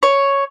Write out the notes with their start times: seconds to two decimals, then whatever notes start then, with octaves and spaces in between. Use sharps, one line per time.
0.03 C#5